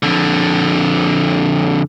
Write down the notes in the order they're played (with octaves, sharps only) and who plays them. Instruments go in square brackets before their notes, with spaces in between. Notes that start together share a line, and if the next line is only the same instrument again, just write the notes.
[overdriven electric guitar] F2 D3